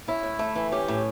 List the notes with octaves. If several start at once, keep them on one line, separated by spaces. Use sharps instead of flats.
C#4 E4
A2
A3
E3
C#4 G4
A2